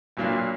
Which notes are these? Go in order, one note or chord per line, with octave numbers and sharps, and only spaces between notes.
B1 A#2 F#3 A#3 D4